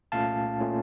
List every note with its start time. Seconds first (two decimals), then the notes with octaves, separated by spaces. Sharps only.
0.12 C2 A#2 A3 C#4 F4 F5 A5
0.60 A#2 A3 C#4 F4